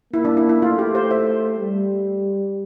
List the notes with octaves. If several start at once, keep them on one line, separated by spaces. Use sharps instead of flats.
A#3 E4
D4
E4
E4
A3 F4
G4
C5
C5 E5
G3